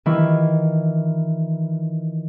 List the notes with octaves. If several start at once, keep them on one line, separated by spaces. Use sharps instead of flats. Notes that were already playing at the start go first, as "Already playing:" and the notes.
D#3 E3 E4 F4